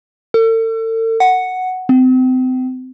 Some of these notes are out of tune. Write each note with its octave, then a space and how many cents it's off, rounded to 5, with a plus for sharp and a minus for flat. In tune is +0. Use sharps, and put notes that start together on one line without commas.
A4 +40
F#5 +0
C4 -35